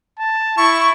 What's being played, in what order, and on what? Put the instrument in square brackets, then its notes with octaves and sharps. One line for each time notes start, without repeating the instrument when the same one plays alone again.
[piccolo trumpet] A5
[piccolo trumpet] E4 [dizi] C#6